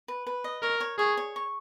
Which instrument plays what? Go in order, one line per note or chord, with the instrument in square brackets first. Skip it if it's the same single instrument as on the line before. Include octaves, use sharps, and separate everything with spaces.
[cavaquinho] B4
B4
D#5
[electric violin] A#4 [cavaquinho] C#5
[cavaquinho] C#5
[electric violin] G#4 [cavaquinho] C#5
[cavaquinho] C#5
C#6